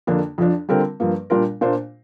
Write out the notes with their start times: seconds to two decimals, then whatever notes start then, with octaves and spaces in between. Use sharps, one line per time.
0.07 F2 D3 A#3 D4
0.38 F2 F3 D4
0.69 D3 G3 C4 F4 A#4
1.00 G2 F3 A#3
1.30 A#2 G3 D4 F4 A#4
1.61 A#2 A#3 D4 F4 C5